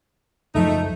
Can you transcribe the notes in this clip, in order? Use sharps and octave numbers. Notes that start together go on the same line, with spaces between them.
C#2 F#2 F3 A3 D#4